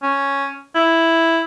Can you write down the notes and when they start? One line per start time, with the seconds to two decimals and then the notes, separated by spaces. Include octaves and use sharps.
0.03 C#4
0.75 E4